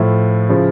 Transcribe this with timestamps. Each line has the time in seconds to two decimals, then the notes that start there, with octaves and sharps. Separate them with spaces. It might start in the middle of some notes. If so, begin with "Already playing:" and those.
Already playing: A2 F3 E4
0.49 C#3 F3